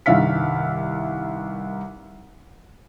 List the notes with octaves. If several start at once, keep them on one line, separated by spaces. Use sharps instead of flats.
C2 G2 D#3 E5 F5 B6